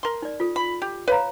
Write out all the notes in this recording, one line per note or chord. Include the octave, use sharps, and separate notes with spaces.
A#4 C6
D#4 D5
F4 A4
B5
G4
B4 C#5 F5 A#5